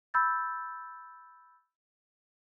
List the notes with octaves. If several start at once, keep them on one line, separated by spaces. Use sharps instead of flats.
B5 E6 G6 A6